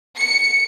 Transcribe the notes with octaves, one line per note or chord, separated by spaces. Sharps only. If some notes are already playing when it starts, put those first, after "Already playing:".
C#7